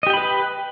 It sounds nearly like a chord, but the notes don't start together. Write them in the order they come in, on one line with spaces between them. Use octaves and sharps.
D#5 G4 G5 B5 B4